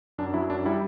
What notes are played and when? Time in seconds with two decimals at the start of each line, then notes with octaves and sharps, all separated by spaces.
0.18 F#2 D4
0.34 F#3 E4
0.50 F#2 D4
0.66 G3 E4